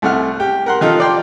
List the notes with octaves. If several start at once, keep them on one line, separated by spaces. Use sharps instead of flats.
C2 A3 F#5 F6
G4
A#4 F#5 C6
D#3 F3 F4 G4 A4
D5 G5 C6